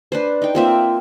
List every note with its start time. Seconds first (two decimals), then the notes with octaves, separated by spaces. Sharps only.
0.12 D4 B4 C5
0.42 D#4 G5
0.55 A#3 C4 F4 E5